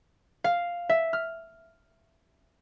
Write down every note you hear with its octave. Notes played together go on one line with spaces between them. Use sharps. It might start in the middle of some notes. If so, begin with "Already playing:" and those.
F5
E5
F6